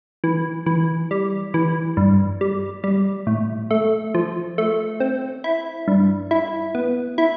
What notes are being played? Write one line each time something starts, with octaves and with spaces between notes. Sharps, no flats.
E3
E3
G3
E3
G2
G3
G3
A2
A3
F3
A3
C4
E4
G2
E4
B3
E4